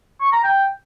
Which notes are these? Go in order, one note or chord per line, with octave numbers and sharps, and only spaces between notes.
C#6
A#5
G5